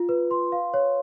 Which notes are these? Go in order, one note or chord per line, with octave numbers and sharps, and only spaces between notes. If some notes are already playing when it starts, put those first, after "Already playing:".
Already playing: F4
B4
C6
F5
C#5